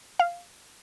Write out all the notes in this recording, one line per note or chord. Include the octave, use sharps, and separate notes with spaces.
F5